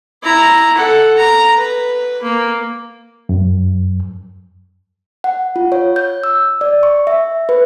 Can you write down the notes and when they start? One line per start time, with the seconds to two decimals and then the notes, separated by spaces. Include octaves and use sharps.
0.23 E4 A#5
0.77 A4 F#5
1.17 A#5
1.56 B4
2.22 A#3
3.29 F#2
5.24 F#5
5.56 F4
5.72 C#5
5.96 G6
6.24 E6
6.61 D5
6.83 C#6
7.07 E5
7.49 B4